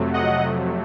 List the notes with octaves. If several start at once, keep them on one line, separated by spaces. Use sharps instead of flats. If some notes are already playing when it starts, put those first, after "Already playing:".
Already playing: F2 C3 F#3 A3
D#5 F#5